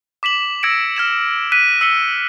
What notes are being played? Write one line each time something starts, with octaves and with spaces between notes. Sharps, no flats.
D6 B6 E7 F#7
E6 G#6 A#6 C#7 D7
F6 G#6 E7
F#6 B6 D#7
E6 B6 C#7 G7